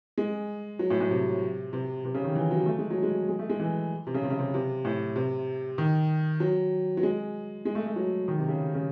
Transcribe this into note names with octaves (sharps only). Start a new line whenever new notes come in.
G#3
F#3
A2
A2
C3
C3
C3
C#3
D#3
E3
F#3
A3
G#3
F#3
G#3
G#3
A3
G#3
E3
C3
C#3
C3
C#3
C3
C3
A2
C3
D#3
F#3
F#3
G#3
G#3
A3
A3
F#3
D#3
C3
C#3
C#3